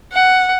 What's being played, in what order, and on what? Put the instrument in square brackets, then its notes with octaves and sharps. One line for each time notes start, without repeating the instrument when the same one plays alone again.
[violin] F#5